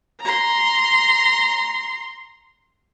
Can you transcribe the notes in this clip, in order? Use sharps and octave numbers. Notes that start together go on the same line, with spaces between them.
A#5 C6